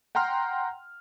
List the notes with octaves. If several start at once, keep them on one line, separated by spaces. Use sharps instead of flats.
F#5 G5 A#5 C6 F6